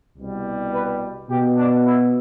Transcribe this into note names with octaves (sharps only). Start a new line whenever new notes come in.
C2 B2 G3
B4
B2 B3 G4
D4
E4